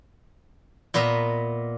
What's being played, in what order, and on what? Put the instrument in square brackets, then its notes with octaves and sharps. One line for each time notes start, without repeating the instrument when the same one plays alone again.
[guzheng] A#2 B3 B4 D#5 E5 A#5